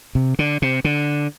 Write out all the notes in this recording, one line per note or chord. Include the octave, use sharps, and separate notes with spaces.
C3
D3
C3
D3